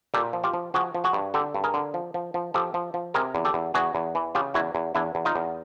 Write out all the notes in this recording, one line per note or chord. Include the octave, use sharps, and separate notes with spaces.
A#2 G4 A4
F3
F4 G4
F3
F3 F#4 G#4
F3
F#4 G#4
G2
D3 G4 A4
G2
G#4 A#4
D3
F3
F3
F3
F3 G4 A4
F3
F3
C3 G#4 A#4
E2
G4 A4
E2
E2 F#4 G#4
E2
E3
C#3 F4 G4
E2 E4 F#4
E2
E2 D4 E4
E2
D#4 F4
E2